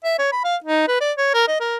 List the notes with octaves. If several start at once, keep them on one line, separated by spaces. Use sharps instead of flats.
E5
C#5
B5
F5
D#4
B4
D5
C#5
A#4
D#5
A#4